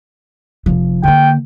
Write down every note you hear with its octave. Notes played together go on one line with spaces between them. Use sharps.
F1 F3
D3 A#3 G5